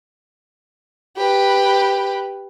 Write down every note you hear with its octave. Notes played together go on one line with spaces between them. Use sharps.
G4 B4